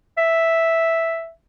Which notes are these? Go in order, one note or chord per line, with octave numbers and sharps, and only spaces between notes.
E5